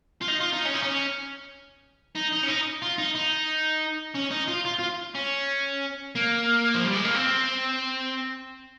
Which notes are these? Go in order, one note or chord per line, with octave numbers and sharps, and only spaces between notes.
F4
D#4
F4
D#4
C#4
D#4
C#4
D#4
D#4
C#4
D#4
F4
D#4
D#4
C#4
D#4
F4
F4
F4
C#4
A#3
F3
G3
G#3
A#3
C4